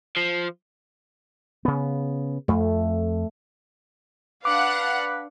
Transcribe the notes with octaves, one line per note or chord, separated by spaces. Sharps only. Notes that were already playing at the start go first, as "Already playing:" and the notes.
F3
C#3 B3
F2 A3
D4 B4 F5 F#5 D6